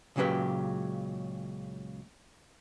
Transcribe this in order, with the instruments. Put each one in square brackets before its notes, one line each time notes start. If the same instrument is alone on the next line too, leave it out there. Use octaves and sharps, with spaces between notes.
[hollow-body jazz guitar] C#2 A#2 C#3 F#3 G4 B4